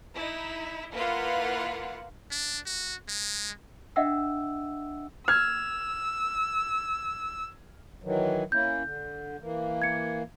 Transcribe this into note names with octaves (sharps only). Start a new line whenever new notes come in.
D#4 E4
A#3 E4 F4 B4 F5 F#5
D4
F#4
G#3
D4 D#5 E5 F#5 G5 E6
E6 F6 G#6
D#3 E3 F#3
A#3 C#4 E4 G6
D3
E3 A#3
G#6 C#7